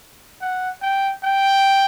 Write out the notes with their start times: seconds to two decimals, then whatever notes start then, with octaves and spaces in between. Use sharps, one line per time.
0.42 F#5
0.82 G5
1.24 G5